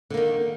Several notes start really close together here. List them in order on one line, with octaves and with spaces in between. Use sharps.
D3 A#3 D#3